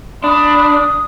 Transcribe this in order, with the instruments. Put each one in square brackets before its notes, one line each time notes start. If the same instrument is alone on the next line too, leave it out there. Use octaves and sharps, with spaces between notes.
[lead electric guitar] D4 [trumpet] B5 [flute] D#6